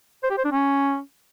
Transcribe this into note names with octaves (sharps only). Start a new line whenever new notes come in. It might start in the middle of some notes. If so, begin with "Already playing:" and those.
C5
G4
C5
D4
C#4